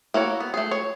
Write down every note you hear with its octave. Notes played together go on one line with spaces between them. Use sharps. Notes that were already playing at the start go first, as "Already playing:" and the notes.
A#3 E4 F#4 C#5
B3
A3 G#4
C#5